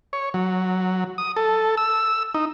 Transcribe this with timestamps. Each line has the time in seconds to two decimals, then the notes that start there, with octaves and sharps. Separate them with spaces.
0.13 C#5
0.34 F#3
1.18 D#6
1.37 A4
1.77 E6
2.34 D#4